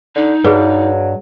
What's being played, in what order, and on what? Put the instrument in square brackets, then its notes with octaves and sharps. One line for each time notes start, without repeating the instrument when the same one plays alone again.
[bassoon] D3 [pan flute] D#4
[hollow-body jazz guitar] G2 [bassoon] F#3 [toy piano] G#4 B4